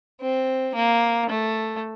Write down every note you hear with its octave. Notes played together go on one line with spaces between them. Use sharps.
C4
A#3
A3